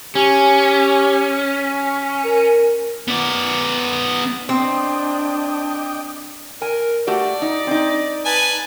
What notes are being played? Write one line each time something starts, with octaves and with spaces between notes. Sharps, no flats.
C#4 G4
A#4
B3 D5
C4 D4 D#5 G5 D6
A#4 G#5
A3 F#4 G4 D5
D#4
C4 D#4
B4 G#5 A5